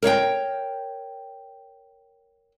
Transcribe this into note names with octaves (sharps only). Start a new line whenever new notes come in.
A#4 C#5 F5 G5